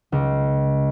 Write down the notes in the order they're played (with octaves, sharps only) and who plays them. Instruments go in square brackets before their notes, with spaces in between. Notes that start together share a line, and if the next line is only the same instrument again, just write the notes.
[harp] C#2